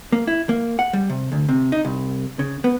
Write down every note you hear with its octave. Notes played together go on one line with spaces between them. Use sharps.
A#3
E4
A#3
F#5
G3
C3
D2
C3
D#4
C2
C#3
B3